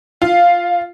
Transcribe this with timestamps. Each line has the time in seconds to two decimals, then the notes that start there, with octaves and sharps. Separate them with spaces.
0.22 F4 F5